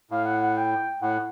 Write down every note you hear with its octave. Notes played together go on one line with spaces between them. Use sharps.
A2 F5
F#5
F#5
G5
A2 F#5